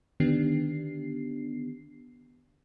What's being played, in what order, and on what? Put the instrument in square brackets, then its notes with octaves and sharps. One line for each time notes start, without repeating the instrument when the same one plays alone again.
[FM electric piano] D3 D#3 B3 D4 G4 C7